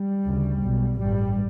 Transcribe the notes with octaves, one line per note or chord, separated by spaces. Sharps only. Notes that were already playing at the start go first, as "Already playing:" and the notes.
Already playing: G3
D2 C#3
B1 B2
A1 G2 G3